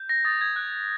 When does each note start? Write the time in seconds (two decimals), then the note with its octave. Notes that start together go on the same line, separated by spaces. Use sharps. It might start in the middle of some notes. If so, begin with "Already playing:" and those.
Already playing: G6
0.09 A#6
0.25 D#6 A6
0.41 G#6
0.56 F#6